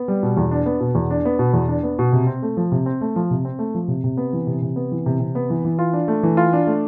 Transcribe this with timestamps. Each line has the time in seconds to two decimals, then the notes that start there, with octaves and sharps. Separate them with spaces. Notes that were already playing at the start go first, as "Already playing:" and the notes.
Already playing: B3
0.08 G3
0.23 B2
0.37 E2
0.51 D4
0.66 B3
0.80 B2
0.95 E2
1.11 D4
1.25 B3
1.39 B2
1.53 E2
1.68 D4
1.83 B3
1.99 B2
2.13 C3
2.27 C4
2.42 A3
2.57 F3
2.72 C3
2.86 C4
3.01 A3
3.16 F3
3.31 C3
3.45 C4
3.59 A3
3.75 F3
3.88 C3
4.04 C3
4.17 B3
4.33 E3
4.47 C3
4.62 C3
4.76 B3
4.92 E3
5.06 C3
5.20 C3
5.35 B3
5.50 E3
5.64 E3
5.79 F4
5.93 D4
6.08 A3
6.23 E3
6.37 F4
6.53 D4
6.67 A3